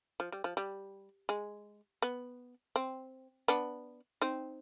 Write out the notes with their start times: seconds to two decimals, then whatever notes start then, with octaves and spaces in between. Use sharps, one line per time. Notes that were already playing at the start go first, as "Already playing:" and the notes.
0.20 F3
0.32 G3
0.44 F3
0.57 G3
1.29 G#3
2.02 B3
2.76 C4
3.48 B3 D4
4.21 C4 D#4